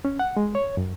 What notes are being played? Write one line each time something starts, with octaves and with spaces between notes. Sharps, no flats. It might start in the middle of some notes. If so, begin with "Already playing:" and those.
C#4
F#5
G#3
C#5
F#2